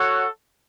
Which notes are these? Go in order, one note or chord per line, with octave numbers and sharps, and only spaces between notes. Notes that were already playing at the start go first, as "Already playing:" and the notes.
Already playing: F#4 A4 C#5 F#5